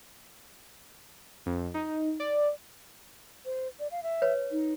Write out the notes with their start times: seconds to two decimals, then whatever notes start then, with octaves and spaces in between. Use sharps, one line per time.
1.46 F2
1.74 D#4
2.20 D5
3.46 C5
3.80 D5
3.91 F5
4.03 E5
4.22 B4 C#5
4.51 D#4